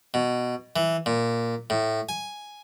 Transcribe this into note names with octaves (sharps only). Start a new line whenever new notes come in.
B2
E3
A#2
A2
G#5